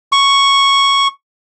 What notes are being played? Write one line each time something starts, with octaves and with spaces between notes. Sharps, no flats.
C#6